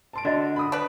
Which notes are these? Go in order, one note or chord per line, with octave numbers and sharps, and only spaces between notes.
A5 C6 D7
D3 F#4 D5 D#5 G#5
B5 D#6
D4 B4